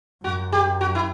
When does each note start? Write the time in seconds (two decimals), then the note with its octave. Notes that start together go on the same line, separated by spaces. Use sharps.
0.24 F#2 F#4
0.52 G4
0.81 F#4
0.95 E4